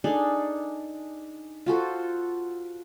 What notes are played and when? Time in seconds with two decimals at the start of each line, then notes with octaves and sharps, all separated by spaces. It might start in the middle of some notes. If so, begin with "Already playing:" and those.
0.04 D4 D#4 G#4 A4
1.66 F4 F#4 A4 C5